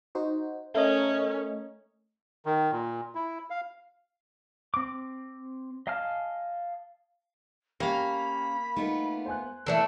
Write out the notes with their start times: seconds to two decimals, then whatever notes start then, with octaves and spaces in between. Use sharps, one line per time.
0.15 D#4 F#4 C5
0.75 A3 C#4 A#4 D#5
2.46 D#3
2.72 A#2
3.15 E4
3.50 F5
4.74 C4 D6
5.87 D#5 F5 G#5 A5 F6
7.80 A#3 C#4 G4 F5 B5
8.76 A3 B3 D#4 F4 A#4
9.26 C5 G#5 F#6
9.66 E3 A3 A#3 D4 E4 A4